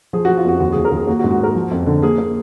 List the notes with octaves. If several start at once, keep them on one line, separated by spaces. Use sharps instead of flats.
F3 G#4
F3 F#4
F4
F2 F#4
D#2 F#4
D#2 G#4
A#4
D#2 G#4
A#3 F#4
F#4
G#2
F#4
A#3 A#4
F3
F2
D3
A#3 G#4
A#3